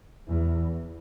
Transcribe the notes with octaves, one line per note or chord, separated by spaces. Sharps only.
E2